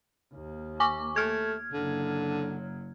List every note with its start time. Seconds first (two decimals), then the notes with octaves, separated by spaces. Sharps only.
0.33 D#2 A#3
0.80 G#5 C#6 D6
1.16 A3 F6 G#6
1.73 F#1 D3 F#3